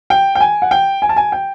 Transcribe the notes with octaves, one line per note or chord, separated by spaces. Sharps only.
G5
G5
G#5
F#5
G5
G#5
A5
G#5
G5